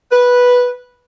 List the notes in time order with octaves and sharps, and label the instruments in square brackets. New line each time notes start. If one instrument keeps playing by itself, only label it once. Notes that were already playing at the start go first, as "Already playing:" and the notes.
[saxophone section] B4